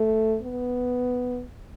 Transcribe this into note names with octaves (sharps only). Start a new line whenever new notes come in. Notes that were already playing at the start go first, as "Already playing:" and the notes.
Already playing: A3
B3